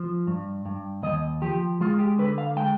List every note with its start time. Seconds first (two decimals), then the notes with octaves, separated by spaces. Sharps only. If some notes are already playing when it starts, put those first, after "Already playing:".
Already playing: F3
0.27 G2
0.66 G2
1.03 D#2 D#5
1.42 F3 G4
1.81 G#3 F4
1.99 G4
2.18 D3 B4
2.38 F5
2.56 G#3 G5